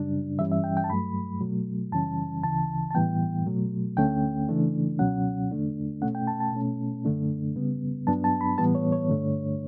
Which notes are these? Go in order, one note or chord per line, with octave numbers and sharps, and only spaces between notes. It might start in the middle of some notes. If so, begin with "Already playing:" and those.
Already playing: F#2 C#3 G3 D4
G2 E3 G3 C#4 E5
E5
G5
G5
A5
G2 F#3 A3 B5
B2 F#3 A3
F#2 C#3 E3 G3 C#4 A5
D2 C#3 E3 A5
A5
A2 E3 G3 B3 G5
B2 F#3 A3
D2 D3 A3 C#4 G5
C#3 E3 A3 D4
C#2 B2 F#3 C#4 F#5
E2 D3 A3 D4
B2 A3 C#4 F#5
G5
A5
A5
B2 A3 C#4
F#2 D3 A3 D4
C#3 G3 B3
G2 F#3 B3 D4 A5
A5
B5
A2 E3 G3 B3 A5
C#5
C#5
G2 D3 A3 D4